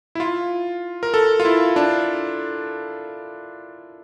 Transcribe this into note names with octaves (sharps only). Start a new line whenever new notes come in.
E4
F4
A#4
A4
F4
E4
D4